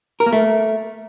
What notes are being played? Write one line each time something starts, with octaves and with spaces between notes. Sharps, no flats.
A#4
A#3
A3